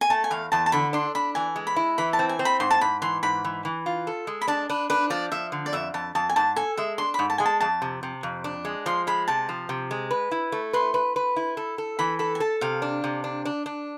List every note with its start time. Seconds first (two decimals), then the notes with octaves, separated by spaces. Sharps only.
0.01 G#5
0.10 A3 A5
0.24 G#5
0.31 E2 F5
0.52 E2 A5
0.66 A5
0.72 D3 B5
0.93 D4 C6
1.15 D4 B5
1.35 E3 G#5
1.56 G#3
1.67 B5
1.76 E4
1.98 E3 B5
2.13 A5
2.19 C4
2.29 G#5
2.39 C4
2.45 B5
2.60 G#2 C6
2.71 A5
2.81 G#2 B5
3.02 E3 C6
3.23 G#2 B5
3.45 E3
3.65 E3
3.86 F4
4.07 A4
4.27 G#3
4.41 B5
4.48 D4 A5
4.69 D4 B4
4.90 D4 B4
5.10 F3 D5
5.32 F3 E5
5.52 D3
5.66 D5
5.73 F2 E5
5.94 F2 A5
6.15 F2 A5
6.29 G#5
6.36 G#2 A5
6.56 A4 G#5
6.77 G#3 E5
6.98 D4 C6
7.14 G#2 B5
7.30 A5
7.38 G#3 G#5
7.46 A5
7.60 F2 A5
7.82 C3
8.03 C3
8.23 F2
8.44 D4
8.65 G#3
8.86 F3 C6
9.07 G#3 B5
9.28 C3 A5
9.49 F3
9.69 C3
9.91 G#3
10.11 B4
10.31 E4
10.52 A3
10.73 B4 C6
10.94 B4
11.16 B4
11.36 E4
11.57 A4
11.78 A4
11.99 E3 B5
12.19 A4 B5
12.35 G#5
12.40 A4 A5
12.61 C3 F5
12.82 D4
13.04 C3
13.24 D4
13.45 D4
13.66 D4